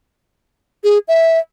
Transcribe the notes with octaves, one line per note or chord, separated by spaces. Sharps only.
G#4
E5